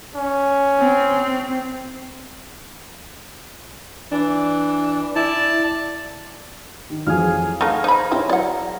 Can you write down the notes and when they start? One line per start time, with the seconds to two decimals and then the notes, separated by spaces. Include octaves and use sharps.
0.15 C#4
0.79 C4
4.11 E3 D4
5.15 E4 D5 A5
6.90 D#3
7.06 F2 E3 F#3 G#4 F5
7.61 A3 D#4 A#4 F5 F#5
7.84 D#4 C5 B5
8.11 C4 E4 C#5
8.29 F#3 D5 F#5